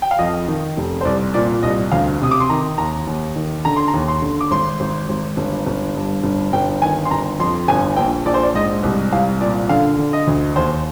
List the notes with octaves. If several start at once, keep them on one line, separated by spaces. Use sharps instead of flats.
G5
F5
F2 D#5
D#3
F1
C5
C2 D5
A#2 D5
C2 D#5
D2 F5
C3 D#6
D6
C6
D#3 A#5
D#2 A#5
D#2
D#3
D3 A#5
C6
A#5
D#2
C6
D3
D6
G#1 C6
G#1
G#1
G1
G1
G2
G1
G1 G5
D#3 G#5
C6
G1 A#5
F2 C6
G1 G#5
A#1 G5
A#1 D5
C5
D5
G#2 D#5
C2
C2 F5
A#2 D5
D3 F5
D3
D#5
D2
D#2 C5